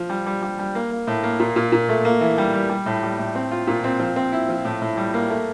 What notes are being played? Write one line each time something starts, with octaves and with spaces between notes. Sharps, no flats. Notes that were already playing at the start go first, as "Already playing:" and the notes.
Already playing: F3
G3
G3
G3
G3
A#3
A#3
A2
A#3
A#2
A#2
A#2
A3
A#3
E3
G3
G3
G3
A2
G3
A2
C4
F4
A#2
C4
F3
C4
E4
F3
A2
A2
G3
A#3
A3